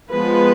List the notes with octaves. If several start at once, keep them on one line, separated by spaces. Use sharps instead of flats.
F3 G#3 B3 B4